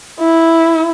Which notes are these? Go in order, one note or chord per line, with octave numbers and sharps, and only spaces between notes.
E4